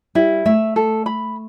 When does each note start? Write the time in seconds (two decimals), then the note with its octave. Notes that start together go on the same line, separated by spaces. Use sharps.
0.15 G3 E4
0.45 A3 E5
0.76 A4
1.06 B5